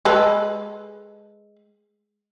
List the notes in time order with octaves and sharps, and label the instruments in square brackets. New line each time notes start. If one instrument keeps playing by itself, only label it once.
[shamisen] G#3 A4 B4